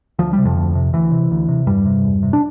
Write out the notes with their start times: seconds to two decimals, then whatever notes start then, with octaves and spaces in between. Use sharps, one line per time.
0.19 D2 F3
0.33 G3
0.38 C3
0.45 F2 F3
0.57 D2
0.75 C3
0.93 D2 E3
1.12 C3
1.31 D2
1.49 C3
1.67 E2 G2 G3
1.85 C3
2.04 E2
2.23 C3
2.33 D4